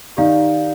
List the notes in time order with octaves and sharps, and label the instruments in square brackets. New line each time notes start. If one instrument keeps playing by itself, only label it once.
[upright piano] D#3 D#4 [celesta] G4 D5 F5